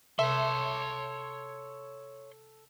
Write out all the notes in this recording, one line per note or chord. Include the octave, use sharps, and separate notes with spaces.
C3 A4 C#5 E5 C6